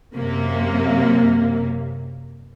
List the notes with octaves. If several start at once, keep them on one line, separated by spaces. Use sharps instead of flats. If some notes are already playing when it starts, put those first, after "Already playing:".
F#2 C3 A#3